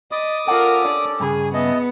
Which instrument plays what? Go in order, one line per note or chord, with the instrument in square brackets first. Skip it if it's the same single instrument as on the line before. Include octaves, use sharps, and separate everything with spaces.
[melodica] D5 B5 [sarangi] D#5 [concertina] D6 D#6
[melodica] C#4 G4 A4 [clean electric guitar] F4 F#5 [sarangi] A#4
[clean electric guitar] D4 [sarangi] D5
[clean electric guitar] G2 C#3 [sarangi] G#4
[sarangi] B3 [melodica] E4 A5 [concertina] D#5